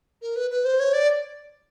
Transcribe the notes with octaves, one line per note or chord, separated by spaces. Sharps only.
A#4
B4
B4
C5
C#5
D5